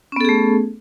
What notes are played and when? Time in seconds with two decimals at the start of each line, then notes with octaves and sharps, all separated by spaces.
0.12 C#4
0.16 B3
0.21 A4
0.25 G#4
0.29 A3